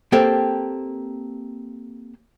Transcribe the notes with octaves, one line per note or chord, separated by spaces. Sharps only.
A#3 C4 G4 A4 G5